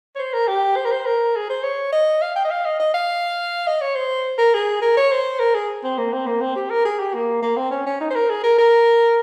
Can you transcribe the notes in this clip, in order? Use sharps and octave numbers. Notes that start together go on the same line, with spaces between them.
C#5
C5
A#4
G4
C5
A#4
C5
A#4
G#4
C5
C#5
D#5
F5
G5
D#5
F5
D#5
D#5
F5
D#5
C#5
C5
A#4
G#4
A#4
C#5
C5
A#4
G#4
C4
A#3
C4
A#3
C4
G4
A#4
G#4
G4
A#3
A#3
C4
C#4
C#4
D#4
C5
A#4
G#4
A#4
A#4